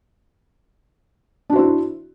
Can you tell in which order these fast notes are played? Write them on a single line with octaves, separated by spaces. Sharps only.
D4 F#4 C5 E4